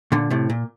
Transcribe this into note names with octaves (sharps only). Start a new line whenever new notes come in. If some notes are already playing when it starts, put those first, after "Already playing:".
A#2 D3
A2 C3
A#2